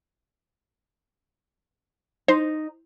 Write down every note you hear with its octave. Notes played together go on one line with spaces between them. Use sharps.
D#4 C5